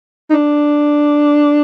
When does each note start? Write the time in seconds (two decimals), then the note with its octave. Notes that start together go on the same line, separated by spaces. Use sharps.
0.30 D#4
0.34 D4